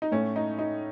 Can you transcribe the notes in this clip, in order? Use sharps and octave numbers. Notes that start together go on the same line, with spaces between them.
D#4
A2 A3 C#4
D#4
D#4